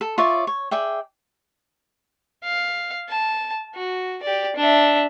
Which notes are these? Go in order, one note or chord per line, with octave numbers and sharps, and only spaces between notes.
A4
F4 C#5 D5 E5
C#5
G#4 D5 E5 G5
F5
A5
F#4
G4 D5
D4 E5